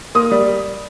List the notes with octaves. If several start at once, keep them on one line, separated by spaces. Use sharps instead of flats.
A#3 D#6
G3